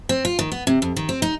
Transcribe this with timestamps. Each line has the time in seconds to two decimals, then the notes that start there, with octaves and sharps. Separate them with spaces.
0.09 C4
0.25 F4
0.39 D#3
0.52 B3
0.67 C3
0.82 F2
0.96 D#3
1.09 C4
1.22 D#4